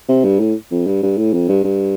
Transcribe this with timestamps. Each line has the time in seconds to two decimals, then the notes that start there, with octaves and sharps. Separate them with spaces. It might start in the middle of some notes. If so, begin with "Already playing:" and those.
0.09 C3
0.24 G2
0.40 A2
0.71 F2
0.87 G2
1.03 G2
1.18 A2
1.34 F2
1.49 G2
1.64 G2